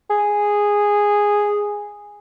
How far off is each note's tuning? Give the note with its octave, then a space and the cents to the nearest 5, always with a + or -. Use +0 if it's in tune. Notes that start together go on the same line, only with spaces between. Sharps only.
G#4 -5